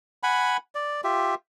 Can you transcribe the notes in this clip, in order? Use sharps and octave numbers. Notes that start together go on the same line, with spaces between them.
F#5 G#5 B5
D5
F4 G4 E5